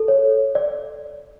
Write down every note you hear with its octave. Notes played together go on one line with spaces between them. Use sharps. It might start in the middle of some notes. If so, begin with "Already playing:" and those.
Already playing: A4
C#5
D5